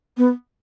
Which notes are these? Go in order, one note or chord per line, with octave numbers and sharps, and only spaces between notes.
B3